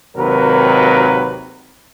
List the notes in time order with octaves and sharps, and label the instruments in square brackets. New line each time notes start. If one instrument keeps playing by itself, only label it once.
[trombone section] G#1 D#2 C3 F#3 A#4 B4